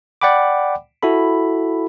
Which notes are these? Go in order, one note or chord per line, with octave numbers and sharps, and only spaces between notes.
D5 F#5 G5 B5 D6
E4 F#4 A4 B5